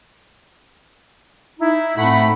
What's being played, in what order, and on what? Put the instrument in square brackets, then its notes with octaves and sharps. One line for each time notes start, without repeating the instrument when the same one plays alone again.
[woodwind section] D#4 [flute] E4
[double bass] A2 C4 [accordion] A3 B5 [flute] F#5